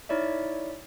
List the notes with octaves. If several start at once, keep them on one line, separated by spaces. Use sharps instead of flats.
D#4 E4 C#5 D5 E5